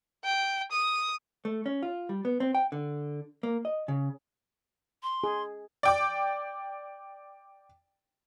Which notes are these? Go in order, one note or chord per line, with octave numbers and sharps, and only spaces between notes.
G5
D#6
A3
C#4
F4
G3
B3
C4
G5
D3
A#3
D#5
C#3
C6
G#4
D5 G5 D6